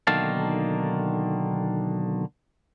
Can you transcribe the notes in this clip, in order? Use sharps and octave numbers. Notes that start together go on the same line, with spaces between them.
B1 D3 D#3 A#3 F5 A5